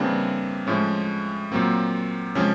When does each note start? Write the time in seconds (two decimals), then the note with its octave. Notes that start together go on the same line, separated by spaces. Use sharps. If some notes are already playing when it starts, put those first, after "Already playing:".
Already playing: C#3 E3 G3 A#3 C4 D4
0.67 A2 F3 G#3 C#4
1.52 A#2 F#3 A#3 C4
2.35 C3 F3 G#3 C#4